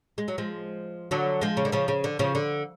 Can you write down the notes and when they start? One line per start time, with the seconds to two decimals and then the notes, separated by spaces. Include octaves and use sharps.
0.18 G#3
0.28 F#3
0.38 F3 G#3
1.11 D3 F#3
1.41 F3 G#3
1.57 C#3
1.65 D3
1.72 C#3 F3
1.88 C#3
2.04 D3
2.19 C#3 F3
2.35 D3